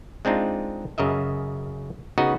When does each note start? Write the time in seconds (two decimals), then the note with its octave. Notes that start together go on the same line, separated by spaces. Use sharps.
0.25 G#3 C4 D4 D#4 F4
0.98 F#2 C#3 A#4 D#5 E5
2.18 C#3 B3 D#4 F#4 D#5